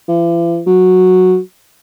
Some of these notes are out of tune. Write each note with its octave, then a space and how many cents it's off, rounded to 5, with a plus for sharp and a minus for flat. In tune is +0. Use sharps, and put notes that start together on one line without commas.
E3 +45
F#3 -10